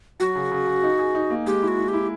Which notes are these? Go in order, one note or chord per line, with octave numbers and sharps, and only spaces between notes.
F#3 F#4
C#3
C#3
C#3
D#4
G#4
D#4
A#3
G#3 G4
E4
F#4
E4
G4
E4